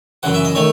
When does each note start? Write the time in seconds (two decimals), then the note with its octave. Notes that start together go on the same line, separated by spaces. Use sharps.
0.23 F#2 C#3 E3 F#5
0.34 E5
0.45 D#5
0.55 D#3 A3 C#5